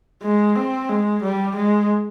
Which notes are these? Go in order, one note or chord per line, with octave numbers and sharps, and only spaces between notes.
G#3
C4
G#3
G3
G#3